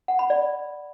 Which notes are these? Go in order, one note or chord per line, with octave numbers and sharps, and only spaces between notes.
F#5
B5
D5